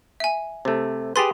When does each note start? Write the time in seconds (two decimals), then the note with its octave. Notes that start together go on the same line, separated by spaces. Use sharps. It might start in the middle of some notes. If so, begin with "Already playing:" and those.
0.20 E5 G#5
0.65 C3 A3
1.16 G4 G#4 B4 C6 A6